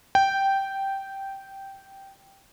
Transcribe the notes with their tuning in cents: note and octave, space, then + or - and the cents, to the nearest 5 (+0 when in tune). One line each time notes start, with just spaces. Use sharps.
G5 -10